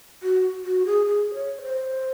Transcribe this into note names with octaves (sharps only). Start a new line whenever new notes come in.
F#4
F#4
G#4
G#4
C#5
C5